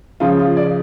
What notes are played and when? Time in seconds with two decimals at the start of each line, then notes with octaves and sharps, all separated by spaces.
0.20 C#3 F3 F4
0.39 F4
0.57 D5